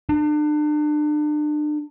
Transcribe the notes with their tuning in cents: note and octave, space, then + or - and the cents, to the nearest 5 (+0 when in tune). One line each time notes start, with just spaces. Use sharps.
D4 +35